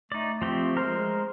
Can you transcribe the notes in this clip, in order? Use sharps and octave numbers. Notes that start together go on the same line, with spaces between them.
A3 D#4 D5
F3 C4 G4
G#3 A#4 C5